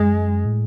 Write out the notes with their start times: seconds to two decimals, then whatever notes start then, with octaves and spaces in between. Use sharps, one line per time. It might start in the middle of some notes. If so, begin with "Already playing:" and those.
Already playing: F#2 G#3
0.45 A2